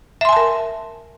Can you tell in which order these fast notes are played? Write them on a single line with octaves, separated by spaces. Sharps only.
E5 C6 G#5 A5 A#4